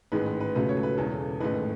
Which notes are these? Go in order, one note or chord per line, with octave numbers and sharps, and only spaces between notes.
A1 G#2 D#3 G#3 B4
B4
B4
C#2 C#3 F#3 A3 B4
C#5
A4
B4
E1 E2 C#3 A4
A1 G#2 D#3 A3 B4